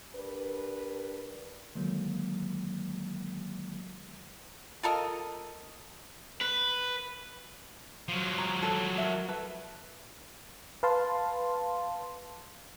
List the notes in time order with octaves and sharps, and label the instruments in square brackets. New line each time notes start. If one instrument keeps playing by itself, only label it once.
[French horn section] D4 G4 A#4 B4
[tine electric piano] D3 D#3 F#3 G#3 A#3
[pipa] F4 A4 A#4 D#5
[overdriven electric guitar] B4
[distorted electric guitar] F3 F#3
[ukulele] A#5
A4 C#5
A#4 E5
A4 B4
[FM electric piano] B4 F5 A5 C6